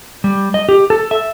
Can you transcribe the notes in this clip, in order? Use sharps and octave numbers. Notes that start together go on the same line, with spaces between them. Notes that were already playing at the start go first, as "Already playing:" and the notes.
G3
D#5
G4
A4
E5